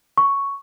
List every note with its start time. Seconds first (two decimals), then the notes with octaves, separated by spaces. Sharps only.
0.17 C#6